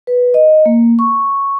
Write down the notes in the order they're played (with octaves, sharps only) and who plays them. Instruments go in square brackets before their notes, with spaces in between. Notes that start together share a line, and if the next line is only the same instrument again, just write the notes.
[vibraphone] B4
D#5
A#3
C#6